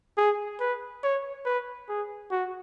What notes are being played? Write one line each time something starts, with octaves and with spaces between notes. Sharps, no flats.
G#4
B4
C#5
B4
G#4
F#4